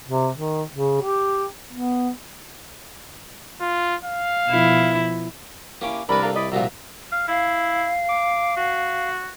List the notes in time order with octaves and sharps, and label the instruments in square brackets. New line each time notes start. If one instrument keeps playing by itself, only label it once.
[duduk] C3
D#3
C#3
G4
B3
[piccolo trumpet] F4
F5
[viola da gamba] B2 F3 E4
[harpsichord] A#3 C#4 D6 [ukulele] E4 G4
[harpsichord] C2 B4 [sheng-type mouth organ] D4 A#4 D5 [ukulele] B5
[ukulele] A4 F5 A#5
[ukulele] E4 D#5 [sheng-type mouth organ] D5 B5
[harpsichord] C2 A#2 F3 [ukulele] F#4 [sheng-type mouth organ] E5 A#5
[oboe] F5
[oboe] E4 [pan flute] F5
[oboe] D6
F#4